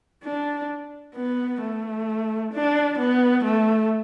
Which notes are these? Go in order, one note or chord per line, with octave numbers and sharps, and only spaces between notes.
D4
B3
A3
D4
B3
A3